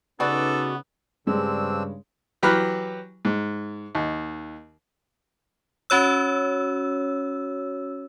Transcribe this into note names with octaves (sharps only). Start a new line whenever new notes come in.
C#3 B3 C#4 D#4 F#4 A4 B4 D5
G2 C#3 G#3 C4 D4 E6
E3 F#3 G4 B5 F6 F#6
G#2
D#2
C#4 F#4 C#5 E6